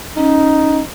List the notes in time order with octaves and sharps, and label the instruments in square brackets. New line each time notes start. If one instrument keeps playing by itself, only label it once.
[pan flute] C#4 [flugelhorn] D#4